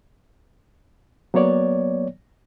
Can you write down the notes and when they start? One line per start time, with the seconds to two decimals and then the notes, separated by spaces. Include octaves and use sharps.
1.34 F#3 A#3 B3 C#5 D5